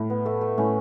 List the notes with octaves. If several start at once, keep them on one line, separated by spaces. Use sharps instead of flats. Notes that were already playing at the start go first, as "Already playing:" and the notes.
Already playing: A2
B3
A3 A4
A3
A2 C#4